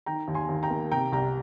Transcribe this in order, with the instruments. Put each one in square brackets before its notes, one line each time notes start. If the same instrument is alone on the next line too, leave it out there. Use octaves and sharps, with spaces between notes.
[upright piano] D#3 G5 A#5
D#2
G#5 C6
D#2
G5 A#5
A#3
C3 G5 A#5
C2 G5 A#5